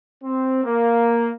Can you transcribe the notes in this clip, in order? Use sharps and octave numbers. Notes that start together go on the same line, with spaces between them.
C4
A#3